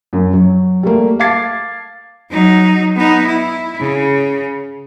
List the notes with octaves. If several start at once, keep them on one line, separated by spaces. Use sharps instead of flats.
F#2
F#3
G3 A3 A#3
F5 A5 D6 G#6 A6 C7
F#3 D#4
B3 D#4
E4
C#3